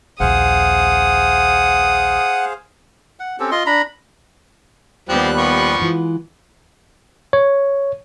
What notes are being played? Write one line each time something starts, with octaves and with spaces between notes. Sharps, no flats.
A#1 D#2 G#4 C5 F5 F#5 D#6
F#5
C4 C#4 G4 A4
F4 D#5 C6
D4 A#5 B5
D#2 F3 G3 B3 C4 G4 F#6
F3 B4 C#6
E3 G#3 F4
C#5